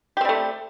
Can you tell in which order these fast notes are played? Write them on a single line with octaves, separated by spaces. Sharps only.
G4 C4 G3 A3